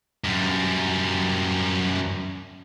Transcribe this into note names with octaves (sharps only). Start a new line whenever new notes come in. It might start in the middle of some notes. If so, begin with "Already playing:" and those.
F#2 G3